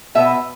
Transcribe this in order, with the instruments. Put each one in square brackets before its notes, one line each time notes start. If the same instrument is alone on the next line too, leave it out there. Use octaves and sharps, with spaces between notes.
[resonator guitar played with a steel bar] B2 B3 E5